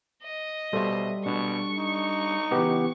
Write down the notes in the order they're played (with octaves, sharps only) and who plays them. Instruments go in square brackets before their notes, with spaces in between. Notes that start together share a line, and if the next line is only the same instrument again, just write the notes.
[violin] D#5
[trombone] B2 [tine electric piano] G3 A4 [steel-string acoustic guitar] C5 E5
[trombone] B2 [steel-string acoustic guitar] D4 [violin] C#6
[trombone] D#4
[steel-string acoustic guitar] C#3 E3 [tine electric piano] B3 G4 B4